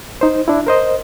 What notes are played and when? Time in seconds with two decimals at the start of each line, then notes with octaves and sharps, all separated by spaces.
0.21 D#4 C5
0.48 D4 E4
0.67 A#4 C5 D#5